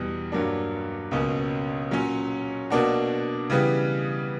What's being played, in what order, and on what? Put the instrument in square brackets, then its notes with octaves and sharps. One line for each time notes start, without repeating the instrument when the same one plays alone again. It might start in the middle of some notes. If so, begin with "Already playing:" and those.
Already playing: [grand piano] E2 B2 G3
G2 F#3 A#3 D4
C#2 B2 A#3 C#4
A#2 F#3 C#4
B2 A#3 D4 F#4
C#3 E3 G3 B3